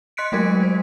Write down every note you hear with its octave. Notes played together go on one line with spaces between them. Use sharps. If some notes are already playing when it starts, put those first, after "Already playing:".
D#5 C6 F#6 B6 C#7 D7
F#3 G#3 A3 A#4 G#6 B6
C5